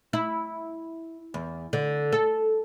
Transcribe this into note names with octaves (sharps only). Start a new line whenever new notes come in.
E4
E2
D3
A4